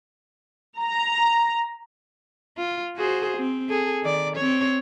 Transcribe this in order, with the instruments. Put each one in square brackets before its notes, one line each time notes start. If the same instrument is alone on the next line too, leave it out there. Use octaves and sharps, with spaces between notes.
[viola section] A#5
[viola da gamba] F4
F#4 G#4 C5
C4
G#4 A4
D#3 D5
C4 C#5